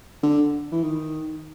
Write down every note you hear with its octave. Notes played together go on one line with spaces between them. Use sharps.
D3
E3
D#3